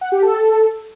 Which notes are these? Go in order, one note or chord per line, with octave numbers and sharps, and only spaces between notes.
F#5
G4
A4